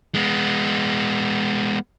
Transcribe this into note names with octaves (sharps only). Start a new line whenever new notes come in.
G#3 B3